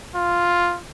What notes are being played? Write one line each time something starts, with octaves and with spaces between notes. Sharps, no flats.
F4